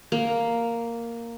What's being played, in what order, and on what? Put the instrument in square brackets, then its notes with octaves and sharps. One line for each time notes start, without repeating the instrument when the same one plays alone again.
[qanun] A#3